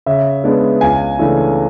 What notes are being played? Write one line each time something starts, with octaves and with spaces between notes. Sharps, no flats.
C#3 E5
G#3 B3 D4
C#2 G#5
C#3 E3 A3 D4